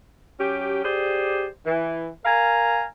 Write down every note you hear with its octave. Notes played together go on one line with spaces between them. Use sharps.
F#3 C#4 G4
G4 G#4 C5 D5
E3
A#4 F5 G#5 A#5